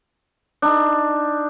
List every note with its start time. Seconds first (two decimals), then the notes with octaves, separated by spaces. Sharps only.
0.62 D4 D#4